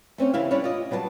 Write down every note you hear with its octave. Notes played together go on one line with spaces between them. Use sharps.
A3 C4 C#4 C#5
C#3 E3 E4 G4 E5 F5
G3 C#4 D4 E4 C#5
F4 D5 D#5
F#3 G3 B3 G5 A5